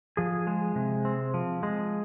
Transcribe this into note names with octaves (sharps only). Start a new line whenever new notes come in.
F3 G#4
G#3
C3
C4
F3
G#3